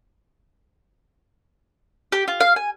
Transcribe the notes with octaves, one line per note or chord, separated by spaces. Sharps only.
G4
F4
F5
G#5